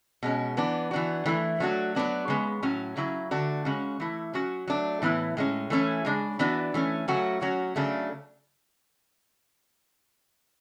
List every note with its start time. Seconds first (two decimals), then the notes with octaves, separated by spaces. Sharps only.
0.23 B2 G#3 C#4
0.57 E3 B3 D4
0.91 E3 B3 D4 F#4
1.26 E3 A3 E4
1.60 F#3 A3 D4 F#4
1.95 F#3 B3 D4 F#4
2.28 C#3 G#3 B3
2.63 A2 F#3 C#4
2.97 C#3 F#3 C#4 E4
3.31 D3 A3 D4 F#4
3.65 C#3 G#3 C#4 F#4
4.00 E3 A3 E4
4.33 F#3 C#4 F#4
4.68 F#3 A3 D4
5.02 A2 E3 B3 E4
5.37 A2 G#3 C#4
5.70 E3 A3 C#4 E4
6.05 C#3 G#3 D4
6.39 E3 B3 D4 F#4
6.74 E3 A3 C#4
7.08 C#3 F#3 A3 C#4 F#4
7.41 F#3 C#4 F#4
7.76 C#3 F#3 A3 D4